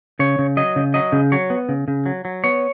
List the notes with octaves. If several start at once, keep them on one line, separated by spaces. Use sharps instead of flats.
C#3 C#5
C#3
F#3 D#5
C#3
F#3 D#5
C#3
F#3 C#5
B3
C#3
C#3
F#3
F#3
B3 C#5